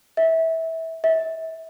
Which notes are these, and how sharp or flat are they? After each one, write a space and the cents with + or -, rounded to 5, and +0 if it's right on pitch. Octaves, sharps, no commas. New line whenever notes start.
E5 -20
E5 -30